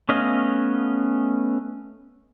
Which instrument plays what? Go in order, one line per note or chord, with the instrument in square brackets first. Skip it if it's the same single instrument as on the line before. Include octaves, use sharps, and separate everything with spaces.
[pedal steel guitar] A3 B3 C#4 D#5 F5